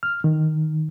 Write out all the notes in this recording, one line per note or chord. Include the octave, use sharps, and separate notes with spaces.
F6
D#3